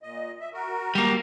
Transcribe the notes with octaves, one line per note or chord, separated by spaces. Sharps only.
A#2 D#5
E5
F#4 A#4
G3 A#3